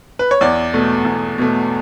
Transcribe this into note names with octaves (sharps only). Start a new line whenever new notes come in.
B4
C#5
E2 D5
B2 A3
E2
B2 A3